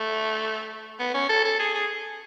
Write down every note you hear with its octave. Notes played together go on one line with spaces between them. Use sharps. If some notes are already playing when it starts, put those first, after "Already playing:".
Already playing: A3
B3
C#4
A4
A4
G#4
G#4